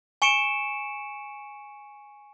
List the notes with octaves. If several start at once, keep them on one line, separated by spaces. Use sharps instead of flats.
G#5 C#6 C#7 D7 E7